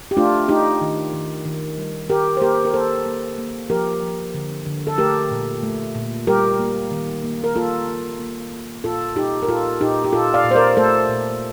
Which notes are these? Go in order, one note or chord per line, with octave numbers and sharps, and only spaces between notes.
G4
A3 D4 F4
A3 D#4 G4
D#3
D#3
D#3
G3
D#3 G4 A#4
C5
A#3 G4 A#4
A#4
A#3 A4 C5
A#3
A#3
F3 G4 A#4
F3
D3
D3
A4
A3 G4 A#4
A#2
A3
A#2
G3 G4 A#4
A#3
D#3
A#3
A#4
A#3 F4 A4
A#3
A#3
A#3
A#2 F4 A4
A#2 D#4 G4
A#4
A#2 F4 A4
A#2 D#4 G4
G4
A#2 F4 A4
D5 F5
A#2
C5
A#4 D5
A3 A4 C5
A#2